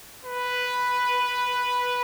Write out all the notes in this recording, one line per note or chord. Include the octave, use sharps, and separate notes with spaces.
B4